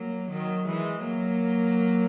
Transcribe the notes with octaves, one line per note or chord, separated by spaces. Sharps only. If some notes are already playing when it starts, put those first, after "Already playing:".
Already playing: F#3 A#3
D#3 F#3
E3 G#3
F#3 A#3